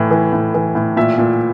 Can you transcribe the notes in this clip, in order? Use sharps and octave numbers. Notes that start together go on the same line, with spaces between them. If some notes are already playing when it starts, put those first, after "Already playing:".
Already playing: A2 E3
E3
A2
E3
A2
A#2 E5
A#2